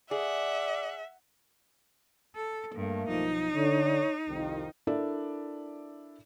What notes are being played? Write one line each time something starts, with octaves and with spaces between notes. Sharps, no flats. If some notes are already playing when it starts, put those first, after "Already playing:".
G#4 D5 E5 F#5
A4
G2 A3 A#3
B1 F3 D#4
D3 C#5
C2 F2 D#3
D4 E4 A4 A#4 D5 E5